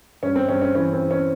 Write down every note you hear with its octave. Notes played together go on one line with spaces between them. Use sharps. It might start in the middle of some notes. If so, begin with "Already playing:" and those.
G2 C#4
C4
G2 C#4
C#4
E3 C#4
C4
E3
C#4